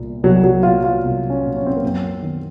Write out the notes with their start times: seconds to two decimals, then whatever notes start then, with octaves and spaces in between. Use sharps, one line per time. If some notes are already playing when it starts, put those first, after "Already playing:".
Already playing: C2 A#2
0.23 C2 F#3
0.44 F#3
0.63 A#2 F4
0.84 F4
1.04 C2
1.30 C#4
1.43 A#2
1.56 C#4
1.66 C4
1.76 A#3
1.83 F#2 C4
2.22 D#3